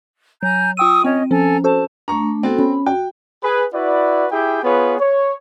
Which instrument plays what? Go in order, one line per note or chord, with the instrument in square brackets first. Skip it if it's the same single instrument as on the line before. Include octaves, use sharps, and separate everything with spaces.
[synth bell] F#3 [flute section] G#5 A#5 G6
[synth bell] F4 G5 D#7 [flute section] C#6 D#6 E6
[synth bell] C4 [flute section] C#4 C#5 D#5
[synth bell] F3 C#4 [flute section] A4 G#5 A#5
[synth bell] F#4 A4 C5 [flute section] A5
[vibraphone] A3 D4 [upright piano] A#5 C#6
[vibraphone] B3 F#4 A4 [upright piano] C4
[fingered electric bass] C#4 [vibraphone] B5
[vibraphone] F#4 [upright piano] G5
[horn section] G#4 B4
E4 F#4 B4 D5
E4 G4 G#4 G5
B3 F4 G#4 B4 C#5
C#5